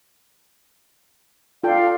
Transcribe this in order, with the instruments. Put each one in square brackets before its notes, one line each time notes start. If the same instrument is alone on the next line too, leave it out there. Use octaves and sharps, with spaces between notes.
[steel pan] F4 A4 G5 [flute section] D5 F5